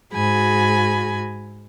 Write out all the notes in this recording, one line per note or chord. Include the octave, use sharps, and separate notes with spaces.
G#2 F#4 G#4 G#5 B5